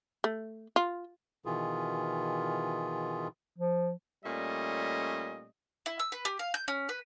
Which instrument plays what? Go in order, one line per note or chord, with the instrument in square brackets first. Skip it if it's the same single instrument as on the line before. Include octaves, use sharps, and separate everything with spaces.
[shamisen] A3
F4
[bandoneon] B2 D#3 E3 F4 G#4
[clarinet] F3
[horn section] A#2 G3 A3 C#4 D#5
[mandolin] E4
E6
B4
G4
F5
G6
C#4
B4